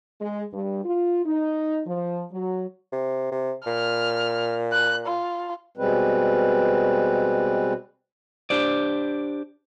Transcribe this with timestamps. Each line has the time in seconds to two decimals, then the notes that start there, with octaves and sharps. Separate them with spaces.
0.21 G#3
0.53 G2
0.85 F4
1.25 D#4
1.87 F3
2.32 F#3
2.92 C3
3.31 C3
3.66 A#2 F6
4.72 F#6
5.06 F4
5.77 B2 G3 G#3 C4 B4
8.50 D4 G4 C5 D5